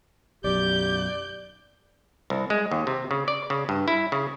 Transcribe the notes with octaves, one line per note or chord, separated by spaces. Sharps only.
B1 F#2 G4 D5 G6
C2
G#3
D#2
C3
C#3
D5
C#3
G2
E4
C#3